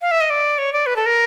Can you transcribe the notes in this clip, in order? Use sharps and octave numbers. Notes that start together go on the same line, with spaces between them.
F5
E5
D#5
D5
C#5
D5
B4
A4
A#4